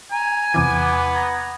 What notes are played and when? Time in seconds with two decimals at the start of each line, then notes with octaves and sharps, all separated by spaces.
0.11 G#5 A#5
0.54 E2 C3 E3 B3 D6
1.14 A#5 G#6